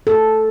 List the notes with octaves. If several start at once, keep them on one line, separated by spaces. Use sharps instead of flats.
A4